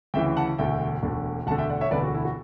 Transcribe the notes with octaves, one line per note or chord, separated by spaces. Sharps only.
D2 C#3 E3 E5 G5
F#5 A5
E1 D2 D3 E5 G5
E1 D2 D3
E1 D2 D3 F#5 A5
E5 G5
D5 F#5
C#5 E5
E1 D2 D3 B4 D5
F#4
E4
F#4